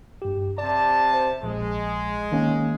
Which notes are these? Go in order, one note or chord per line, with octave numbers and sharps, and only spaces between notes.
G2 G4
C3 D5 A5
C5
A#1 G#3
D#3 A#3 C#4